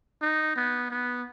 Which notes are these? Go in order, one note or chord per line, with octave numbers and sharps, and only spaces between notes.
D#4
B3
B3